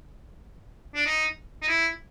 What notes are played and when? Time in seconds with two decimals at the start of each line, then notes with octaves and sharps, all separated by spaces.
0.95 D4
1.06 D#4
1.62 D#4
1.68 E4